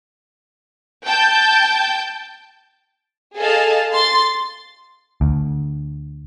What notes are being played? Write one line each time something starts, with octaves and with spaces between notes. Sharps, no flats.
G5 A5 G6
G#4 A4 D#5 F5 A5
C6 A6
D2